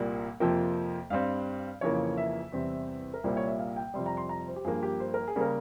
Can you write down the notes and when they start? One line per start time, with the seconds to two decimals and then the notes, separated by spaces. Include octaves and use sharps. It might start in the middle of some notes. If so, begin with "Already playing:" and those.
Already playing: C2 A#2 G3 A#3
0.40 F2 C3 F3 A#3 G5
1.10 G2 G3 C4 F5
1.81 F2 C#3 E3 A#3 C#5
2.17 E5
2.52 E2 C3 G3 C4
3.14 A#4
3.24 C2 A#2 G3 A#3 C5
3.37 C#5
3.47 E5
3.59 F5
3.76 G5
3.94 F2 C3 G3 C6
4.06 A#5
4.17 C6
4.29 A#5
4.48 C5
4.56 G4
4.65 G2 F3 A#3 G#4
4.83 G4
5.00 C5
5.14 A#4
5.28 G#4
5.36 C#3 G3 A#3 A#4